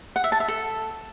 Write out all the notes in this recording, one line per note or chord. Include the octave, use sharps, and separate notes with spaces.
F#5
E5
A5
E5
A4